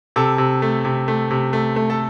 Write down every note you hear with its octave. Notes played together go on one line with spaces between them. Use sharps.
C3 A4
C3
A3
C3
A3
C3
A3
A3
A4